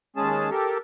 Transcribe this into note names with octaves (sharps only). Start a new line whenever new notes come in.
D#2 G#3 C#4 G#4 A5
G4 A4 A#4